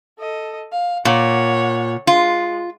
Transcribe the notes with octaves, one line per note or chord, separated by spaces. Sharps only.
A4 D#5
F5
A#2 C#5 F#5
G#3 F4